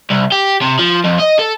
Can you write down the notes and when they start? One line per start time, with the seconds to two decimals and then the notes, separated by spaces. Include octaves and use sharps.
0.10 C2
0.32 G4
0.62 C3
0.79 F3
1.05 F2
1.20 D#5
1.39 A4